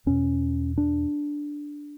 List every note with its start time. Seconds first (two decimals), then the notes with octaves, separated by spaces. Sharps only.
0.06 E2 B2 C#4
0.78 D4